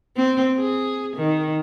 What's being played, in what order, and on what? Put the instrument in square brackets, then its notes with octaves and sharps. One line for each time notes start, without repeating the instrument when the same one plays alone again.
[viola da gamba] C4
G#4
D#3